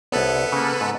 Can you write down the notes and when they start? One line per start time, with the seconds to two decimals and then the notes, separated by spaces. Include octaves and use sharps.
0.12 C2 B3 A4 B4 C#5
0.52 C#3 A#3
0.81 G#2